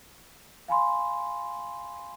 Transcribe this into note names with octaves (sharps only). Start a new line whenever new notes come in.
F5 G#5 B5 C6